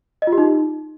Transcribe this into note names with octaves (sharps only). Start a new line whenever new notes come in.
D#5
F4
G4
D#4